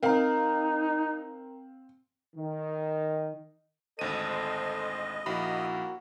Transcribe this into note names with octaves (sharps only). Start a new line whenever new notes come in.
C4 D#4 A#4 F5 A#5
D#3
G#1 D2 A4 C5 D#5 D#7
A#1 D#2 A#3 E4 F#4 B5